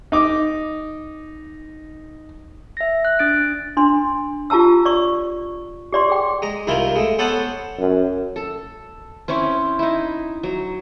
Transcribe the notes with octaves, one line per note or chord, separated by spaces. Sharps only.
D#4 D6
E5 A#6
F#6
D4 A6 D7
D4 C6
F4 G4 A5 A#5 E6
D5 C#6
G4 D5 C6
G#4 G5
G#3 A#5
C2 D#3 E4 F4
G#3 A3
B3 A4 C5 C#5 F#5 A5
F#2
A4
C4 C#4 E4 C#5
D#4 E4
F#3